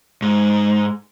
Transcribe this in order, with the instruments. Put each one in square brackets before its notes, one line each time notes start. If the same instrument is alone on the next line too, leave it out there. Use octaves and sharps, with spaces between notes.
[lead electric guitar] G#2